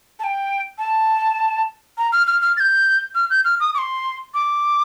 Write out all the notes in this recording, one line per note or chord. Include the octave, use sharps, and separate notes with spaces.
A5
G5
A5
A#5
F6
F6
F6
A6
G6
F6
G6
F6
D#6
D6
C6
D6